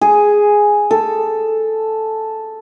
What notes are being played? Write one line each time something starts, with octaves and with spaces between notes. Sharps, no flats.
G#4
A4